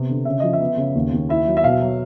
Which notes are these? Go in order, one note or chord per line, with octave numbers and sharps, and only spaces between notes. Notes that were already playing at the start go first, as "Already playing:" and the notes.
Already playing: C3 B3
D3
C#3 E5
F3 D#5
E5
B3
C#3
D#2
D#2
E4 E5
F#3
E5
B2 F5
F#3